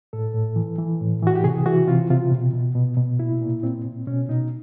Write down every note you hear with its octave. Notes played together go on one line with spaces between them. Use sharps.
A2 A4
A2
E3
E3
A2
E3 F#4
G4
C3 G#4
E3 F#4
C3 F4
C3 F4
B2
B2
B2
B2
A#2 E4
A#2
A#2 C4
A#2
B2 C#4
B2 D#4